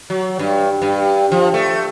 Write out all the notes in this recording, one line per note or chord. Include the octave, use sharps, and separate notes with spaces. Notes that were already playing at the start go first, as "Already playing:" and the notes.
F#3
G2
G2
F3
A3